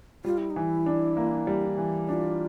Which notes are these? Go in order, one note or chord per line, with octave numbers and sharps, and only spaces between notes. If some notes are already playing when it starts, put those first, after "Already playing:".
G3 F4
E4
D#4
E3
E4
D4
A#3
G3
E3
D4 F4